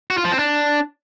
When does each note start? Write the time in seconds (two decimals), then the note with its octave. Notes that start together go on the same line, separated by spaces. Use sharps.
0.10 F#4
0.17 F4
0.25 F3
0.32 C4
0.39 D4